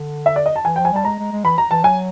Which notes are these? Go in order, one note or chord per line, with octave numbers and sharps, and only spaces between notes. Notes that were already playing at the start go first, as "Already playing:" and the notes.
Already playing: D3
E5
D5
D#5
A5
E3 G#5
G5
F3
G#5
G3 A5
G#3 A#5
G#3
G#3
E3 B5
A#5
E3 A5
F#3 G#5